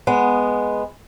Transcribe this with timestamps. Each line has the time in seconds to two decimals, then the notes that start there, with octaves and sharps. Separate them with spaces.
0.07 G#3 B3